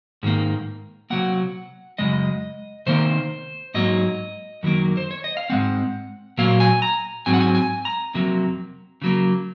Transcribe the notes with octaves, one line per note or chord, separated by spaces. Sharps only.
G#2 D#3 A#3
C3 D#3 F#3 A#3 F#5
F#2 C#3 G#3 D#5
C3 D#3 A#3 C5
G#2 F#3 A#3 D#5
F#2 D#3 F#3 A#3
C5
C#5
D#5
F5
G#2 D#3 G#3 C4 F#5
A#2 F#3 A#3 F5
G#5
A#5
G#2 F#3 C4 G#5
F#5
G#5
G#5
A#5
F2 C3 F#3 A#3
C#3 F#3 A#3